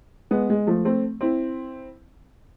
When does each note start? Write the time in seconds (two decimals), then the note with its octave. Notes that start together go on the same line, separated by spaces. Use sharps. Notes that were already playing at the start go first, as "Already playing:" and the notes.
0.31 G#3 B3
0.50 G#3
0.67 F3 A3
0.85 A3 C4
1.21 C4 E4